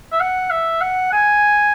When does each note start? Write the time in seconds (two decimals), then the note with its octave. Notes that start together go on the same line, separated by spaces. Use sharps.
0.12 E5
0.20 F#5
0.51 E5
0.81 F#5
1.13 G#5